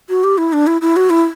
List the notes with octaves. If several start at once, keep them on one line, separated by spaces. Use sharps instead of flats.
F#4
G4
E4
D4
E4
E4
F#4
E4